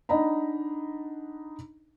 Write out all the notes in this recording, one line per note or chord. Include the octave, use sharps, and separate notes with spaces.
D4 D#4 D#5 F#5 A#5 B5